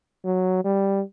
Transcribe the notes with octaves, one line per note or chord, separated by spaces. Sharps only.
F#3
G3